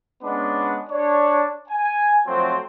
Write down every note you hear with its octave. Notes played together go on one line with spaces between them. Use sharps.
G#3 B3 C#4 D4
D4 C#5
G#5
F3 F#3 A3 C4